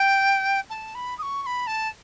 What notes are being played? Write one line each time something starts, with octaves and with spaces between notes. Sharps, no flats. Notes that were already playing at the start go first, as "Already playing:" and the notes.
Already playing: G5
A5
B5
D#6
C#6
C#6
B5
A5